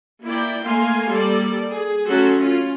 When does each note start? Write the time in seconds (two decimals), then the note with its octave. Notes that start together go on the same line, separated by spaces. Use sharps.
0.24 A#3 E4 D5 G5
0.64 A3 A#3 F5 G#5 C6
1.10 G3 A#3 A4 D5
1.72 G#4
2.06 F#3 A3 C#4 F#4 A4 C6
2.38 C#4 F4